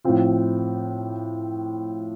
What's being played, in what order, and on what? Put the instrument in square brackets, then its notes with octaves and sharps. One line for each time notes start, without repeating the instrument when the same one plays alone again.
[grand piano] A2 F3 C4 F4